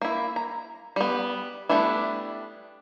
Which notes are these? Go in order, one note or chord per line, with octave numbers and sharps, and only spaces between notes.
A#3 E4
A#5
G3 B3
G3 A3 B3 D4 E4